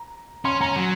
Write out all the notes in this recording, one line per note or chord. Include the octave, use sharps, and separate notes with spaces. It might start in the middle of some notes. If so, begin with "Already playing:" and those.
Already playing: A#5
C#4 C6
C#4 A#5
F#3